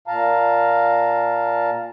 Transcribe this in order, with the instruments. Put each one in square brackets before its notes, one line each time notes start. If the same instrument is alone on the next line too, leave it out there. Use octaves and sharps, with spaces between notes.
[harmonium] A#2 F5 A5 A#5